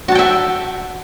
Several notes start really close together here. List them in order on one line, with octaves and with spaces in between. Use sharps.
F#4 A5 G5 E5